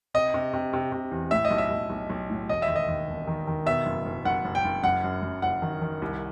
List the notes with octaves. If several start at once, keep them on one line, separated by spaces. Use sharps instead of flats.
C3 D#5
C3
C3
C3
C3
E2
A2 E5
D#5
B1
E5
B1
B1
B1
A2
E1 D#5
E5
D#2
D#5
D#2
E1
D#3
D#3
B2 E5
F#1
F#1
F#1 F#5
F#1
G5
F#1
F#2 F#5
F#2
F#2
F#1 F#5
D#3
D#3
C2